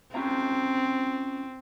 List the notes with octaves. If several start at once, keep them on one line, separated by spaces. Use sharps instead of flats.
C4 C#4 F4 A#5